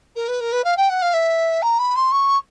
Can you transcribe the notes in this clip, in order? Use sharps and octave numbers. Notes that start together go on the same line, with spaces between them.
A#4
B4
A#4
B4
F5
G5
F#5
F5
E5
A#5
B5
C6
C#6